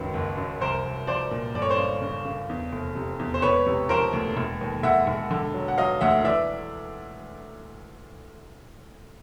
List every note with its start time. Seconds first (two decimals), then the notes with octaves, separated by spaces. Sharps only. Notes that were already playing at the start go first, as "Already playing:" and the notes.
Already playing: C#2 F#2 D#3 B4
0.14 F#1
0.37 F#2
0.61 C2 A#4 C5
0.84 C2
1.07 F3 C5 D5
1.31 A#2
1.54 G1 D5
1.62 C#5
1.69 C5 D5
1.78 C#3
2.02 C#3
2.25 C#3
2.49 E2
2.73 F1
2.95 C3
3.19 E2
3.34 C5
3.42 E1 B4 C#5
3.66 C3
3.89 F3 A#4 C5
4.13 D2
4.37 E1
4.61 D#2
4.83 E1 E5 F#5
5.07 E1
5.31 D3
5.54 F#3
5.68 F#5
5.78 F#3 D#5 F5
6.01 D2 E5 F#5
6.24 E3 D5 E5